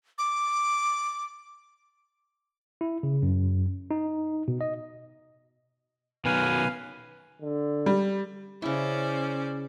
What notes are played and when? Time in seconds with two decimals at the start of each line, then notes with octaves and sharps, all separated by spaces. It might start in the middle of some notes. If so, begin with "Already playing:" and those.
0.18 D6
2.81 E4
3.03 C#3
3.23 F#2
3.91 D#4
4.48 B2
4.61 D#5
6.25 B2 D#3 F#3 B4 F5 G#5
7.42 D3
7.86 G3
8.62 C#3 C#4 E4 C5 D5